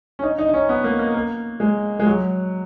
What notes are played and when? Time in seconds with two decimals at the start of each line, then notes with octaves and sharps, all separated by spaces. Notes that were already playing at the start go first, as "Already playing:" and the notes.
0.19 C#4
0.23 D#4
0.39 D#4
0.49 D#4
0.54 C#4
0.69 B3
0.84 A#3
0.99 A#3
1.14 A#3
1.60 G#3
2.00 G#3
2.06 F#3